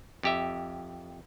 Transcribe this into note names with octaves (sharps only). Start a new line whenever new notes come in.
F2 G4 E5